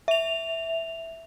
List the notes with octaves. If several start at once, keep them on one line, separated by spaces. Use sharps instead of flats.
E5 F7